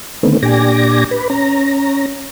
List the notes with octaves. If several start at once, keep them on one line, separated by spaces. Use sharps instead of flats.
D3 D#3 A3 B3 C4
A#2 D4 G4 G#5 D6 A#6
B4
C#4 A#5